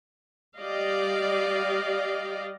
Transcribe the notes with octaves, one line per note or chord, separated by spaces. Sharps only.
G3 G4 D5 D#5 F5